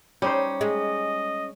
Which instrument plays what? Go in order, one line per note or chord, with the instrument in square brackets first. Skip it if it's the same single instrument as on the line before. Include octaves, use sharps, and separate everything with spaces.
[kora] G3 D#4 C5 [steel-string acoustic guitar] C#4
[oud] G#3 [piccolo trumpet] D#5